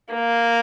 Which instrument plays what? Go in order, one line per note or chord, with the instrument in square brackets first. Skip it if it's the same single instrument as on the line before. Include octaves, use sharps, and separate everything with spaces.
[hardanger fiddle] A#3